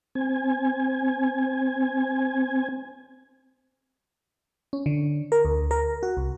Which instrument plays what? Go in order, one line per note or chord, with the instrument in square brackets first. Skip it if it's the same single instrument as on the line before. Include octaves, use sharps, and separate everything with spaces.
[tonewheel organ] C4 G#5
[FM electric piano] C#4
D3
A#4
D2
A#4
F#4
C2